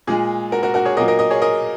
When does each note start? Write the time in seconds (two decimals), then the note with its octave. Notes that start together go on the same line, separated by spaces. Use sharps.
0.07 A#2 G#3 G#4
0.52 F#4 A#4
0.63 F#4 A#4
0.74 F#4 A#4
0.85 G#4 C#5
0.97 A#2 F#3 A#3 A#4 D#5
1.08 A#4 D#5
1.19 A#4 D#5
1.30 G#4 C#5
1.42 A#4 D#5